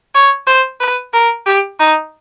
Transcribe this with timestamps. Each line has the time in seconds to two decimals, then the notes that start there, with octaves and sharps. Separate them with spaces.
0.15 C#5
0.47 C5
0.80 B4
1.13 A#4
1.46 G4
1.80 D#4